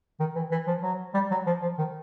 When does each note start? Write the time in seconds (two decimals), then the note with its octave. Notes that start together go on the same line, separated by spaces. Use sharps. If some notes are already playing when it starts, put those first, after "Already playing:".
0.20 D#3
0.35 E3
0.51 E3
0.67 F3
0.82 F#3
1.14 G3
1.31 F#3
1.46 F3
1.62 F3
1.78 D#3